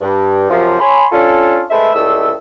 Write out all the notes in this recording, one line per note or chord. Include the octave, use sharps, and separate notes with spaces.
G2
F#2 C3 F3
C#5 G#5 B5 C6
C#4 D4 F4 A4
G#3 A3 A4 B4 C5 E5
C#2 A2 G3 A3 D#5 E6